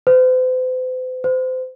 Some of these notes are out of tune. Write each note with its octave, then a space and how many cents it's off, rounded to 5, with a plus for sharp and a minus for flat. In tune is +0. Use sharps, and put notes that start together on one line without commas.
C5 -45
C5 -30